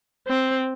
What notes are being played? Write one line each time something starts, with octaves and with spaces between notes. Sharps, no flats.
C4